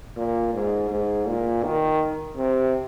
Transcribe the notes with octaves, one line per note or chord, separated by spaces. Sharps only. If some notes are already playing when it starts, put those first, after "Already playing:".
A#2
G#2
G#2
A#2
D#3
C3